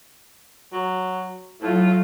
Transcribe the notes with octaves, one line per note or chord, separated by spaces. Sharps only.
F#3
A2 F#3 A3 F4